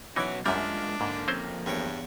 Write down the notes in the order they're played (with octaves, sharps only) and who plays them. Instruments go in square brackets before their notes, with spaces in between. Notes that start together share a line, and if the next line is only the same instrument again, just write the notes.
[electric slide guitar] B2 F#3 F#4 [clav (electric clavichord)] E3 D#4 [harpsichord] C#4 E5 D6
[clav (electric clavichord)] F#2 G3 [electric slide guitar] G#3 A#3 F4 [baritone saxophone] D4 [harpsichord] E5
[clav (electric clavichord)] G#2 [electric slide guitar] D3 A#3
[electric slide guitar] F2 A#3 [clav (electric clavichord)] C4 C#4 C5
[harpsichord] E2 C#5 G5 [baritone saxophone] G2